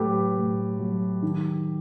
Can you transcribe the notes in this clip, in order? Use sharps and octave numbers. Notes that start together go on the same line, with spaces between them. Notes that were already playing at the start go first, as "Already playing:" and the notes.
Already playing: A2 F#3 G4 A4 B4
A2
F#3
D#3